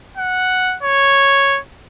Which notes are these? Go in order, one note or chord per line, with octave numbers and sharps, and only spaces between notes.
F#5
C#5